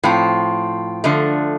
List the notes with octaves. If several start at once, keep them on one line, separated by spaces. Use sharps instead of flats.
A2 F3 C4
D3 F3 A3